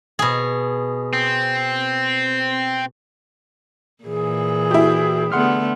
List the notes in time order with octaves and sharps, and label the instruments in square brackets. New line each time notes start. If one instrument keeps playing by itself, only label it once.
[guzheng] B2 G#4
[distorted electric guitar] C4
[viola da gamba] A#2 E3 [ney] G#4
[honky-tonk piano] E4 G4 [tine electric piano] F#4
[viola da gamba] D3 A3 B3 [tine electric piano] F#5 C6 F6